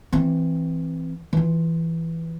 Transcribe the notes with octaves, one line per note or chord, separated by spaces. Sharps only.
E3 C4
E3 F4